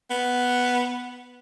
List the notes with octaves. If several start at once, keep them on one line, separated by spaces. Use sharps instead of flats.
B3